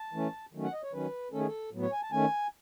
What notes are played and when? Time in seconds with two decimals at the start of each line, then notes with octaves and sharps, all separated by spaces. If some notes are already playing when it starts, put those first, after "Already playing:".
Already playing: A5
0.13 E3 A3 C#4
0.53 D#3 F#3 A3 C#4
0.63 F#5
0.73 D#5
0.83 C#5
0.93 D#3 F#3 C#4 B4
1.32 D#3 A3 C#4 A4
1.40 G#4
1.47 A4
1.72 A2 F#3 B3
1.82 C#5
1.92 G#5
2.02 A5
2.12 D#3 A3 C#4 G#5